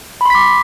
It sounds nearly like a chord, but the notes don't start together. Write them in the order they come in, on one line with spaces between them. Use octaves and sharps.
B5 C6 B6 D6